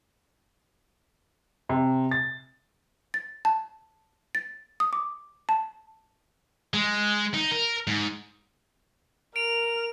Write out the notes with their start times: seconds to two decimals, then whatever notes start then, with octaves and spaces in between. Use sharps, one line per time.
1.69 C3
2.11 A6
3.14 A6
3.45 A5
4.35 A6
4.80 D#6
4.93 D6
5.49 A5
6.74 G#3
7.34 D#4
7.51 A#4
7.87 G#2
9.36 A#4 D7 F7